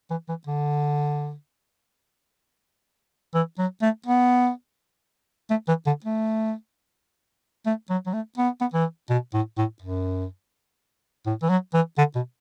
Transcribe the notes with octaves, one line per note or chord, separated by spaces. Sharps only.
E3
E3
D3
E3
F#3
A3
B3
A3
E3
D3
A3
A3
F#3
F#3
A3
B3
B3
E3
B2
A2
A2
F#2
A2
E3
F#3
E3
D3
B2